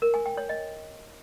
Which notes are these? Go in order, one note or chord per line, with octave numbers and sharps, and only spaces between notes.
A#4
G#5
G5
C#5
D#5